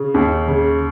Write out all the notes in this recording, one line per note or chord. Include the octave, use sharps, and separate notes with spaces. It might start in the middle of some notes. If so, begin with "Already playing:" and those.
Already playing: C#3
D#2
C#3